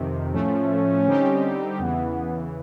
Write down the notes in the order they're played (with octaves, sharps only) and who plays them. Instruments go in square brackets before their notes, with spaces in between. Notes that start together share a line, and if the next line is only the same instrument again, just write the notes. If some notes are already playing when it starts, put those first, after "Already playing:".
Already playing: [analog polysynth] F2 C3 D#3
[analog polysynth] A2 F3 A3 [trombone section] C#4
[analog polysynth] D3 G3 C4 D#4 G4
[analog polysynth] E2 C#3 E3 [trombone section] B3